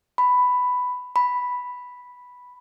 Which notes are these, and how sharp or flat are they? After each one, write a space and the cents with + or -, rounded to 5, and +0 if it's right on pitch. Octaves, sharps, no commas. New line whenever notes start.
B5 +10
B5 +0